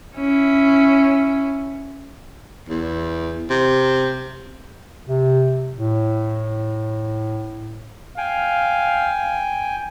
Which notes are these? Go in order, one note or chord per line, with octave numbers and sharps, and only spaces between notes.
C#4 E4
E2
C3
C3
A2
F5 G5 G#5